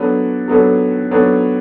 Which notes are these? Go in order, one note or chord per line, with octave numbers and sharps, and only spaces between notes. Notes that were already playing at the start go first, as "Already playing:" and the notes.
Already playing: F#3 B3 D4 A4 C#5
F#3 B3 D4 A4 C#5
F#3 B3 D4 A4 C#5